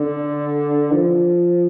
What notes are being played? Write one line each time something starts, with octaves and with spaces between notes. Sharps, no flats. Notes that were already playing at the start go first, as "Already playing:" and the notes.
Already playing: D3
F3